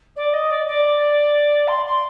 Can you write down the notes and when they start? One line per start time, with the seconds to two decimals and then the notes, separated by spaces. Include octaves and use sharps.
0.16 D5
0.33 D#5
0.50 D5
0.67 D5
1.67 C6
1.85 C6